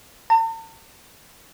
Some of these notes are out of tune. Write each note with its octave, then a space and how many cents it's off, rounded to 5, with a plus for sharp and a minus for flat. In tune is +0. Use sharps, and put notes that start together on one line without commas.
A5 +45